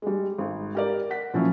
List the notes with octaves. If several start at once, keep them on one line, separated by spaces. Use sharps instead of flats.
G3 G#3
G#1
G4 A#4 D5
F#5 B6
A#2 F3 F#3 C#4 E4